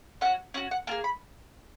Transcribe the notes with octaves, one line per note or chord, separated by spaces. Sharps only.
C#4 F#4 F#5
C#4 F#4 F#5
F#5
A#3 F4 G#4 G#5
B5